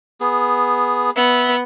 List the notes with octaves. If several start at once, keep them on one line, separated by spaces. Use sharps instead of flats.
B3 G#4
B3 E5